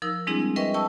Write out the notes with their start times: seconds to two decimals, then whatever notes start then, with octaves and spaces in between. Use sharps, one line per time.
0.02 F3 D#4 A#4 E6
0.27 G3 G#3 C4 D4 E4 G#4
0.56 A#4 B4 D#5 E5 G5 C#6
0.74 G5 A5 C#6 E6